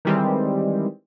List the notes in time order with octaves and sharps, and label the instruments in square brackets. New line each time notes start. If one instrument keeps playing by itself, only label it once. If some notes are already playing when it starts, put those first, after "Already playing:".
[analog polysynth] D#3 E3 G3 G#3 C4